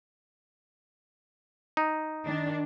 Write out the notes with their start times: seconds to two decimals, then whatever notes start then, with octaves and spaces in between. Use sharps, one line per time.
1.77 D#4
2.26 D#3 D4